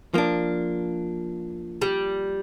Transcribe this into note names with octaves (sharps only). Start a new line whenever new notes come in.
F3 A#3 D4
G3